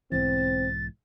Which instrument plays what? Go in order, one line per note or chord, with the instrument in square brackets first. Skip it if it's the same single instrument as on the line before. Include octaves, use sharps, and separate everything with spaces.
[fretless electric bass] B1 G#2 E3 [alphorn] C4 [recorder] A6